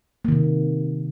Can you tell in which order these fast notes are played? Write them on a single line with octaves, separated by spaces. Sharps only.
A#3 D#3 C3